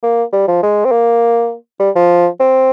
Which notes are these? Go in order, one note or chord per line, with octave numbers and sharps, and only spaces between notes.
A#3
G3
F3
G#3
C4
A#3
G3
F3
C4